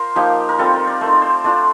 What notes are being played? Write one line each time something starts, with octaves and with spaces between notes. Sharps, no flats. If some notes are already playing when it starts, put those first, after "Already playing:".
Already playing: F4 A#4 C5
F3 A#3 D#4 G4
A#4
G3 C4 F4 A4
A#4
D5
A3 D#4 C5
D5
C5
A3 D4 F4 D5